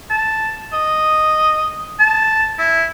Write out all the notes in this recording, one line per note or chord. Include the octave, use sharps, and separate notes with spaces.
A5
D#5
A5
E4